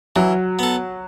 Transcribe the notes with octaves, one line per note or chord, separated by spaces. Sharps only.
E3 F#3
B3 A4